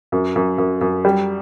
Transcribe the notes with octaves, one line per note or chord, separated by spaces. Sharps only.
F#2
F#2
F#2
F#2
G3